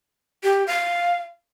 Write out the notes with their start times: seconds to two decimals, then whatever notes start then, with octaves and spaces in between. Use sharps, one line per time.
0.43 G4
0.67 F5